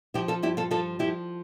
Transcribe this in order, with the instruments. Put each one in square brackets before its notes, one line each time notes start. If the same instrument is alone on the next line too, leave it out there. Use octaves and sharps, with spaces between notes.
[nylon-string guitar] F3 E4 G4
F4 A4
G2 E4 G4
F4 A4
F3 F4 A4
F3 E4 G4